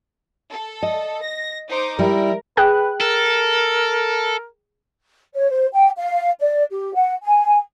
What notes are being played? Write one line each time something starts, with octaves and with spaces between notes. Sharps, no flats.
A4
D#5
A#6
D#4 C5 D6
G3 E4 A#4
G#4 B4 G5 F#6
A4 A#4
C#5
C5
G5
F5
D5
G4
F#5
G#5